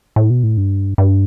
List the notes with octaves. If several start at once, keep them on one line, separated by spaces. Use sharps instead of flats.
A2
B2
A2
G2
G2